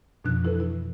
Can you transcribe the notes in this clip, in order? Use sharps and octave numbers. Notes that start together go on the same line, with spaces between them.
F2 B2 F3 D4 F#6
E3 E4 A4 B4
E4